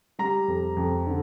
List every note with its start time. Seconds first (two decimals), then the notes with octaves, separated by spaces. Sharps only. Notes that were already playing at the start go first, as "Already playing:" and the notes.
0.19 G3 A#5
0.48 F2
0.77 F2
1.07 D3